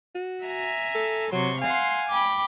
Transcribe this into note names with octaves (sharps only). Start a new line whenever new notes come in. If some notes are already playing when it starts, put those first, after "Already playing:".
F#4
E5 G#5 A#5
A4
C3 F#3 C6 C#6
F5 F#5 G#5 C6
G5 B5 D6